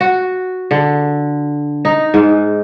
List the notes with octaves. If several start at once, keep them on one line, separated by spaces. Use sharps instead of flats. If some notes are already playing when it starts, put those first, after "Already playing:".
F#4
D3
D#4
G#2